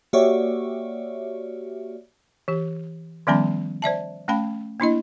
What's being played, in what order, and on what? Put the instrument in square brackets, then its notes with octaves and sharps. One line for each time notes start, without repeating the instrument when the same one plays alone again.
[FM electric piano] A#3 F#4 G4 C#5 D5 E5
[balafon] E3 G4
D#3 F3 G3 B3 C#4 B5
C5 D5 E5 A5
A3 C#4 F5 G5 B5
A#3 D4 E4 D#5